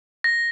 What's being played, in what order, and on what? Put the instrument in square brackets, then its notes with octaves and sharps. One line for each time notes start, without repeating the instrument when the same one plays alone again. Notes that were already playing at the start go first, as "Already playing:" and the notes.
[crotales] A#6